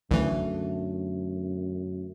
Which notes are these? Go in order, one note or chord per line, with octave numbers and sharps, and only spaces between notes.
C2 F#2 D3 E3 A3